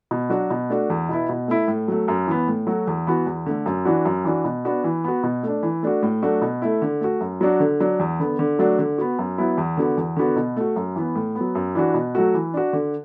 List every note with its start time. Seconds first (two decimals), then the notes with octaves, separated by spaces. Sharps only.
0.11 B2
0.30 F#3 D4 F#4
0.51 B2
0.70 A3 D4 F#4
0.90 E2
1.09 B2 B3 E4
1.29 B2
1.48 A3 E4
1.68 A2
1.88 F#3 A3
2.08 F#2
2.27 E3 B3
2.48 A2
2.67 F#3 A3 F#4
2.87 E2
3.07 E3 B3 F#4
3.26 E2
3.46 D3 A3
3.66 F#2
3.85 E3 D4 F#4
4.05 F#2
4.24 E3 D4 F#4
4.45 B2
4.65 B3 D4 F#4
4.84 E3
5.04 B3 F#4
5.23 B2
5.43 A3 D4
5.63 E3
5.83 A3 D4 F#4
6.02 A2
6.23 F#3 A3 D4 F#4
6.42 B2
6.62 A3 E4
6.82 D3
7.01 A3 F#4
7.20 F#2
7.41 F#3 D4 F#4
7.60 D3
7.80 F#3 D4
7.99 E2
8.20 D3 B3
8.39 D3
8.59 F#3 A3 D4 F#4
8.79 D3
8.98 B3 F#4
9.19 F#2
9.38 F#3 B3 E4
9.58 E2
9.77 D3 B3 F#4
9.97 E2
10.17 D3 B3 F#4
10.36 B2
10.57 A3 F#4
10.76 F#2
10.96 E3 B3
11.15 A2
11.35 B3
11.41 F#3
11.55 F#2
11.75 E3 D4 F#4
11.94 B2
12.15 F#3 A3 F#4
12.34 E3
12.54 D4 F#4
12.73 D3